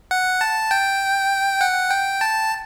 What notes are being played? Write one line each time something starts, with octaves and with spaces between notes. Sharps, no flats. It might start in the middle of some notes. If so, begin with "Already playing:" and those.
F#5
A5
G5
F#5
G5
A5